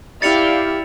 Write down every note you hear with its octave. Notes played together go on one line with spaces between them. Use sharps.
E4 G4 D5 F5 G5 A6 C#7 F7